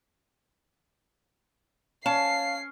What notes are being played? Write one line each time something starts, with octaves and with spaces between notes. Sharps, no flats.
C#4 F5 A5 C7